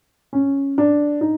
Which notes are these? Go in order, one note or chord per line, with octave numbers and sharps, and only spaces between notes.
C#4
D4
D#4